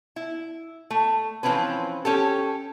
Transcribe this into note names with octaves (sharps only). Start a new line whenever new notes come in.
E4
A3
E3 F3 C4 C#4 B4
C#4 G4 A4